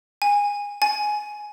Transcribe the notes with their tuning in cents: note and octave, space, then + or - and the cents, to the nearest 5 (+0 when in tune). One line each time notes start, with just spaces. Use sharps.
G#5 -20
G#5 +10